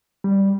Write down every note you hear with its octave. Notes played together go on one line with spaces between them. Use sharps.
G3